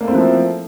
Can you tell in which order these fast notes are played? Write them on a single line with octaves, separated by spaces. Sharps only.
A#3 A3 C4 E4 F3